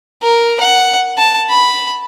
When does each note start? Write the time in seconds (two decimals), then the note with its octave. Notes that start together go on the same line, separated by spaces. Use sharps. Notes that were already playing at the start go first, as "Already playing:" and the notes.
0.22 A#4
0.60 F#5
1.18 A5
1.49 B5